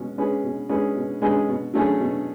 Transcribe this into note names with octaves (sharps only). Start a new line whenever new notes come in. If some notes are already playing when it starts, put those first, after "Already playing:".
Already playing: B2 G#3 C#4
G#3 C#4 G#4 B4
B2
G#3 C#4 G#4 B4
B2
G#3 C#4 G#4 B4
B2
F#3 A3 C#4 G#4
B2